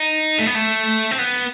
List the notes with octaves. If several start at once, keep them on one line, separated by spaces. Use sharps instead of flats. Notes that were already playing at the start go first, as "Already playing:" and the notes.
Already playing: D#4
A3
B3
A3
C4
B3